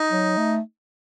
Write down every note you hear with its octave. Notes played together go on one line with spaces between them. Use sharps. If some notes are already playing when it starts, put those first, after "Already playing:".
Already playing: D#4
F#3
A3